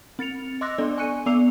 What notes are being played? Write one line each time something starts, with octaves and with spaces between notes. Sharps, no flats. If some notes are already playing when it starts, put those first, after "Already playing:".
C4 A6 C#7 F7
D#5 C6 D6 E6 F#6 A#6
B3 D4 A4 D5
G#5 C#6 F#6 C#7 D#7
B3 D5 D6 E6 C7 F7